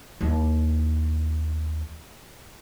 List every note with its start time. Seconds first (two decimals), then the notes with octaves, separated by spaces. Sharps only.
0.21 D#2 E3